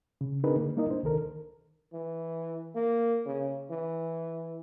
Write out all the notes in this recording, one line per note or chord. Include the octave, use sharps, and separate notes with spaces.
C#3
C4 D4 D#4 G#4 A#4 B4
D3 A#3
G3 A#3 D#4 E4 A#4 D#5
D4 C5
C2 D#3 A4 A#4
E3
A#3
C#3
E3